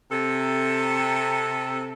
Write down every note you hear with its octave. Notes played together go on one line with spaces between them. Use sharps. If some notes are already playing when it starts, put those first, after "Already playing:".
C3 A4